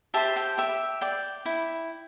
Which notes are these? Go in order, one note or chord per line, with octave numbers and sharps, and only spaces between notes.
G4 C5 E5 A5
G5
G4 E5
D5 G5
E4